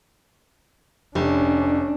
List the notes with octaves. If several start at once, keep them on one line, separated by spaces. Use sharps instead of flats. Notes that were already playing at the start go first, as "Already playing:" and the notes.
F1 C#4 D4